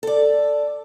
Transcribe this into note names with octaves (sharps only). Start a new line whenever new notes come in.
A4 D5